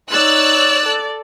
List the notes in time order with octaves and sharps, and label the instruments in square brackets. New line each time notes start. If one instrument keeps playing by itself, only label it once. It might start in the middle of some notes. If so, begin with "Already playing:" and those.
[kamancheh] D#4 C#5 [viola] D5 [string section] E6 F#6
[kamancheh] A4